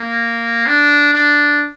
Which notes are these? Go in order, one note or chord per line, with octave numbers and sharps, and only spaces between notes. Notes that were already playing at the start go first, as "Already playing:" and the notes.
Already playing: A#3
D4
D4